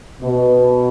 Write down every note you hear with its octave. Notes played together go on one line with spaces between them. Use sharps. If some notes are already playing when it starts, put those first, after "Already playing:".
B2